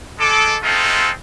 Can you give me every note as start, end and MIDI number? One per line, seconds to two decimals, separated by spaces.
0.19 0.56 56
0.19 0.56 69
0.19 0.56 86
0.62 1.10 56
0.62 1.10 57
0.62 1.10 60
0.62 1.10 63
0.62 1.10 65
0.62 1.10 69